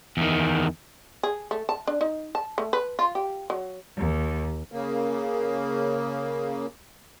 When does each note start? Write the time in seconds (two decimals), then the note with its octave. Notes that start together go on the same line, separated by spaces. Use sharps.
0.17 E2 D#3
1.23 G#4
1.51 A3
1.69 A5
1.87 D4
2.01 D#4
2.35 A5
2.58 A3
2.73 B4
2.99 F4
3.15 G4
3.50 F#3
3.98 D#2
4.72 C#3 A#3